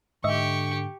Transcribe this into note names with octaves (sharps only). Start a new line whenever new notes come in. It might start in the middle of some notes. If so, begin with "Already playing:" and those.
G#2 D3 G4 D#5 E5 C#6